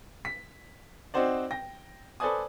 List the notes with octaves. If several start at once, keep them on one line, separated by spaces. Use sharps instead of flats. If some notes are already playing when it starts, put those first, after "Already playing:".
B6
C4 D#4 F#4 C5 D5
G5 A#6
A4 B4 C5 D5 G#5 D#6